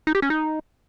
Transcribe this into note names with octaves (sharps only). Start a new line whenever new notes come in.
D#4
G4
C#4
D#4